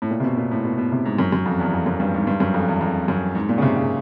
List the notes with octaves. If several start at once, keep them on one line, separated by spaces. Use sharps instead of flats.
A2
A#2
C3
B2
A#2
A2
B2
B2
C3
G#2
F#2
F#2
F2
E2
F2
F#2
G2
G#2
G2
F#2
F2
E2
F2
F#2
G#2
A#2
C#3
C3
C#3